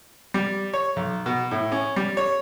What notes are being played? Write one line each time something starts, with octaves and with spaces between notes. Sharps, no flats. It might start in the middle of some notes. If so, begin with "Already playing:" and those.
G3
C#5
B1
B2
A2
C#4
G3
C#5